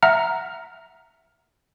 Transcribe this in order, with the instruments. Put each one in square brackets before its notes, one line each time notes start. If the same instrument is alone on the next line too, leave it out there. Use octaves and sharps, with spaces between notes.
[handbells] E5 F#5 A#5 F6